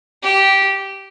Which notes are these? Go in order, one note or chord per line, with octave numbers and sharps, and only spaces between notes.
G4